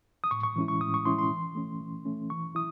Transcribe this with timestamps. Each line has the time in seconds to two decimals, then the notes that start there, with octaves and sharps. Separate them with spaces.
0.24 D#6
0.31 A2 C#6
0.43 C#6
0.56 E3 G#3 C#4 E4
0.68 C#6
0.81 A2 D#6
0.94 C#6
1.05 E3 G#3 C#4 E4 C6
1.19 C6
1.31 E3
1.55 A3 C#4
1.81 E3
2.06 A3 C#4
2.30 E3 C#6
2.55 E4 D#6